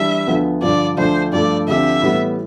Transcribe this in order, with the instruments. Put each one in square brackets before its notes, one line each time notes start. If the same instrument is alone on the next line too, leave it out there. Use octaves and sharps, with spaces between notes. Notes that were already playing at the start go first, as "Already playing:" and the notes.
Already playing: [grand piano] E3 G3 D4 [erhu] E5
[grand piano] D2 D3 F3 B3
[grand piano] G2 D3 F3 [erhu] D5
[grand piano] D2 D3 F3 A3 D4 [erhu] C5
[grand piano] G2 F3 A3 [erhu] D5
[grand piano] D2 D3 F3 C4 G4 [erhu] E5
[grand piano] A2 E3 G3 B3